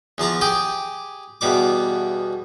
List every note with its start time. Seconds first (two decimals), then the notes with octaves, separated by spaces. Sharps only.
0.18 E2 F3 A5 A#5
0.41 G4 G#4 G5
1.41 E2 B2 G3 D6